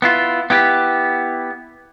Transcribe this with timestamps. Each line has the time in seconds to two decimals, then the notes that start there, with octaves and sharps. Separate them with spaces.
0.02 B3 E4 F4
0.50 B3 E4 G4